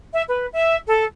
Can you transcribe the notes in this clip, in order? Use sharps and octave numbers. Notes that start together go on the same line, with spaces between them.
E5
B4
E5
A4